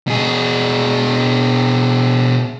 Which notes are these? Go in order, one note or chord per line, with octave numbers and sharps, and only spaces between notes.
B2 G#4